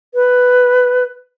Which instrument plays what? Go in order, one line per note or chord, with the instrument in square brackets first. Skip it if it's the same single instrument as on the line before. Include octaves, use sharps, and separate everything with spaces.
[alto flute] B4